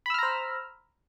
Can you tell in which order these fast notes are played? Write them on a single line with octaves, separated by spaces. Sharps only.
B5 E6 F6 A#5 C5